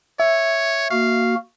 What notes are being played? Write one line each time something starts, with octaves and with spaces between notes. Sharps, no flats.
C#5 E5
A#3 F#4 F5